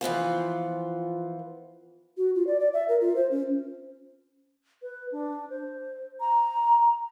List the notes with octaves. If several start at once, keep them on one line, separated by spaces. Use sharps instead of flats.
E3 F3 B3 F4
F#4
F4
D5
D5
E5
A#4
F4
C5
C#4
B4
D4
C5
A#5